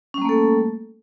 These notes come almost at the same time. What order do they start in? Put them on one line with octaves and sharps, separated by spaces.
C#4 G3 A#3 A3 A4